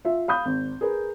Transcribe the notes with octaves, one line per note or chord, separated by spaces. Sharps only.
F4 E5
F5 B5 D#6 G6
G#1
G#4 A#4 B4